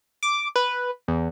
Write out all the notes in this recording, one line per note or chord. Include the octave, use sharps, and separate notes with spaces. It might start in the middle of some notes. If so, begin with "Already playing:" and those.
D6
B4
E2